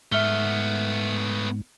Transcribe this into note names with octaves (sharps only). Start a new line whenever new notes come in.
G#2 A3 B3 E5 F6 G7